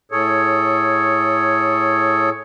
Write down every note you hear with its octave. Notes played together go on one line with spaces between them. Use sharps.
A2 G#4 A4 C#5